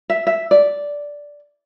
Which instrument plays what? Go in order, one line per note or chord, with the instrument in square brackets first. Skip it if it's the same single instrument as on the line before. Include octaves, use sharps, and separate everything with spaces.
[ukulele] E5
E5
D5